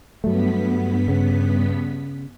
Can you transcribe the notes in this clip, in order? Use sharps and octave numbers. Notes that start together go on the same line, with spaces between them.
G2 F#3 A3 B3 B6
C#3